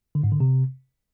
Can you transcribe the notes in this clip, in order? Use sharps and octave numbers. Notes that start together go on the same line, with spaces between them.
D3
G#2
D3
C3